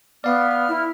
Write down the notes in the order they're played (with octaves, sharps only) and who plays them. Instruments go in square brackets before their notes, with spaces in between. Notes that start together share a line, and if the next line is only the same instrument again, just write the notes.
[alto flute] B3 [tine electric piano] D5 F5 [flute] F6
[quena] E4